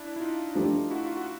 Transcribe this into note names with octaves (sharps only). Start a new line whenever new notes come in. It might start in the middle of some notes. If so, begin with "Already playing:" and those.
Already playing: D4 E4
E4
D#4 F4
F3 A3 D4 G4
E4 F#4
F4
F#4